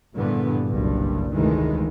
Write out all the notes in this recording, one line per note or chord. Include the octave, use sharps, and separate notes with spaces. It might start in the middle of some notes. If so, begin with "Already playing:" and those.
A#1 G2 D3 E3 B3
F#1 C2 G2
F1 D2 D#3 E3 G#3